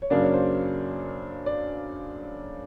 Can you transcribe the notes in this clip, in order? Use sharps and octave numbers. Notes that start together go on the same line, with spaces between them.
C#5
F#2 C#3 F#3 A#3 D4 D5
C#5
C5
D5